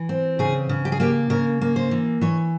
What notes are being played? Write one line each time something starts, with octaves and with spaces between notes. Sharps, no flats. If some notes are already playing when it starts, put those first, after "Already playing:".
Already playing: E3
C4
C#3 G#4
C#3
G4
G#4
A#3 G4
C#3 A#4
A#3
C5
E3
E3 C#5